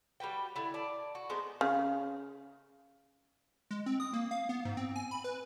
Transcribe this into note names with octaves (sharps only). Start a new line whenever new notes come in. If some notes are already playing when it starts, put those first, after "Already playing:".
G3 F#4 B4 G5
D3 E4
D5 A5
F#4
G#3 B3 D#4 C5
C#3
G#3
C4
D#6
A#3
F5
B3
G#2
C4
G#5
B5
B4